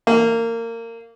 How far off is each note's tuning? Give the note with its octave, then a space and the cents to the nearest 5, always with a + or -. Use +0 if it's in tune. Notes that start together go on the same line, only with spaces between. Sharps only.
A#3 -25